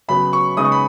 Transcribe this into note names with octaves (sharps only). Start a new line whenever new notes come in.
C#3 F#3 B3 B5
C#6
C#3 G#3 B3 D#4 D#6
C#6
B5